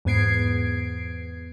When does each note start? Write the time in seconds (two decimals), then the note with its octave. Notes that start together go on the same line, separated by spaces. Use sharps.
0.05 E2 G#2 B3 G#6 C7 D7